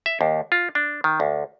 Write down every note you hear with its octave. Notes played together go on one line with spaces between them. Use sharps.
E5
D#2
F4
D4
D#3
D2